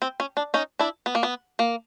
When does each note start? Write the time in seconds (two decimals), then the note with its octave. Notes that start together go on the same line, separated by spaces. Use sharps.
0.02 C4
0.20 C#4
0.37 D4
0.54 C#4 D#4
0.79 D4 E4
1.06 B3
1.15 A#3
1.23 B3
1.59 A#3